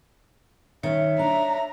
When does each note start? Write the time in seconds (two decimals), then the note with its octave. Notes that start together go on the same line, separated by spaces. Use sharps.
0.83 D#3 C#4 C#5 E5
1.19 D4 A#5